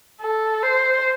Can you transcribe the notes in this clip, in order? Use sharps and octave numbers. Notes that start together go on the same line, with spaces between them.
A4
C5